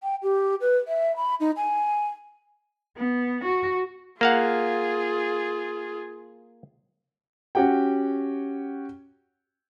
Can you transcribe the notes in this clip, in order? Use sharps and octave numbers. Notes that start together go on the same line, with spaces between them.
G5
G4
B4
E5
B5
D#4
G#5
B3
F#4
A#3 F4 G#4 F5 F#5
C#4 F#4 G4 F#5 G5